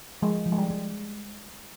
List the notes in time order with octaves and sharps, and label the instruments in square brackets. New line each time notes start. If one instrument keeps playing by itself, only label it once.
[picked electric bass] F3 [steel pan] G#3
[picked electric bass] F3
[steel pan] G#3
G3
[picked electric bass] G#3